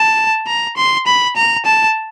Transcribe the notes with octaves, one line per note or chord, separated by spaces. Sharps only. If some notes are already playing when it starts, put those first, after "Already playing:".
Already playing: A5
A#5
C6
B5
A#5
A5